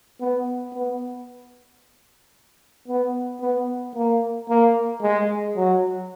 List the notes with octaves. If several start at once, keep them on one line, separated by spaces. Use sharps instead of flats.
B3
B3
B3
B3
A#3
A#3
G#3
F#3